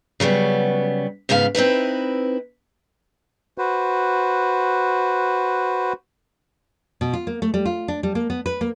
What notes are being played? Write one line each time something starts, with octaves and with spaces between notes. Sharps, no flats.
C#3 F#3 G3 B3
G#2 C#3 B3 A4 F5
C4 D#4 E4 B4
F#4 B4 C5
B2
F4
A#3
A3
G3
F4
D4
G3
A#3
B3
B4
A#3